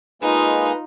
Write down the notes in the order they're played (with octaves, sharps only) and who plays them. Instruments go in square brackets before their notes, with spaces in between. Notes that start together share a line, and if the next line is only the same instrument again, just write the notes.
[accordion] G#3 A#3 G#4 [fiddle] D#4 [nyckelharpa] F4 D#5 [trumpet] B4